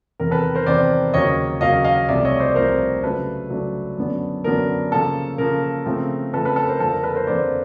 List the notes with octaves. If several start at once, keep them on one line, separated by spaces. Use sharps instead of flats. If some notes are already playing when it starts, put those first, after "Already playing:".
E2 C3 D#3 A#4
A4 B4
A#4 C5
E2 C3 D#3 C5 D5
D#2 C#3 F#3 A#3 C#5 D#5
D#2 C#3 F#3 A#3 D#5 F5
D#5 F5
C2 C3 F3 A3 D5 E5
C#5 D#5
C5 D5
C2 C3 F3 A3 A#4 C5
C#3 F#3 A3 D4 A4 B4
C#3 F#3 A3 D4
F#2 D3 F#3 B3 D4
F#2 D3 F#3 B3 D4 A#4
C#3 F3 A#3 A4
C#3 F3 A#3 A#4
C#3 F3 A3 C4
C#3 F3 A3 C4 A4 B4
A4 B4
A4 B4
A#4 C5
F2 D3 F3 A#3 A4
A#4
A4 B4
A#4 C5
F2 D3 F3 A#3 C5 D5